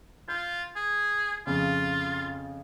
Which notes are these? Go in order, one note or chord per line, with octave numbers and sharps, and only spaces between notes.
F4 G6
G#4
F2 C#3 F4